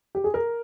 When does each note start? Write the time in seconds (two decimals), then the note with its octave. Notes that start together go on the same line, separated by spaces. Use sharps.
0.15 G4
0.24 G#4
0.34 A#4